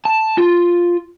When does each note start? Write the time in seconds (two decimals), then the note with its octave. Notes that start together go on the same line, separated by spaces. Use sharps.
0.05 A5
0.38 F4